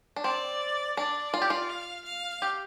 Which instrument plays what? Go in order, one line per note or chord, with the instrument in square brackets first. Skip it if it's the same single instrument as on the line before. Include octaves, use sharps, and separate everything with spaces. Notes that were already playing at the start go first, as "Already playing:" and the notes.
[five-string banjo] D4
[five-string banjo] C4 [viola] D5
[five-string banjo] D4 [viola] D5
[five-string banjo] F4
G4
F4
[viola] F5
F5
[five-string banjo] G4